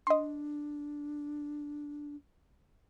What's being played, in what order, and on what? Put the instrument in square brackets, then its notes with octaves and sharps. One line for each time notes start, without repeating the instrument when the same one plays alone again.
[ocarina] D4 [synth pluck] D#5 C6